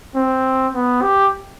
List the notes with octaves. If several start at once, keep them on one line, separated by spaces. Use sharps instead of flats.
C4
B3
G4